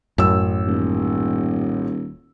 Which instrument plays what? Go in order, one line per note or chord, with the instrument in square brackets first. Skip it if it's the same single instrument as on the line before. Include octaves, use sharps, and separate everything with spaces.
[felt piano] A1 E6 [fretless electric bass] F#2
[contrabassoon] D#1